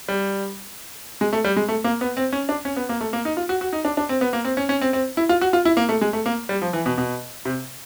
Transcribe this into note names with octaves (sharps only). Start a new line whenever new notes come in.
G3
G#3
A3
G3
G#3
A3
A#3
B3
C4
C#4
D4
C#4
B3
A#3
A3
A#3
D#4
F4
F#4
F#4
D#4
D4
D4
C4
B3
A#3
C4
C#4
C#4
C4
C4
E4
F4
F#4
F4
E4
A#3
A3
G#3
A3
A#3
G3
F3
E3
B2
B2
C3